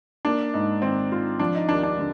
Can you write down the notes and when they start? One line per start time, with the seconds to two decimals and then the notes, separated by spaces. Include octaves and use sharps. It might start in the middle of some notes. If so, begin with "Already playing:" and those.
0.25 A#3 D4
0.54 G#2 D#4
0.82 D#3 C4
1.12 F4
1.40 F3 D4
1.55 D#4
1.69 D#2 D4
1.83 D4
1.98 D3